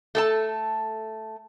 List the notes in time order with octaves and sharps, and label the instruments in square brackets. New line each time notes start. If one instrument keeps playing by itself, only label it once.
[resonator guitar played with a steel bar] A3 A4 A5